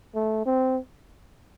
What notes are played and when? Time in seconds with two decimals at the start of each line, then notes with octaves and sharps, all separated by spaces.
0.15 A3
0.46 C4